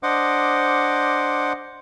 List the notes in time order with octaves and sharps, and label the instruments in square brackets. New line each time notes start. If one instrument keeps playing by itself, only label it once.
[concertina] D4 C5 D#5 F#5 D6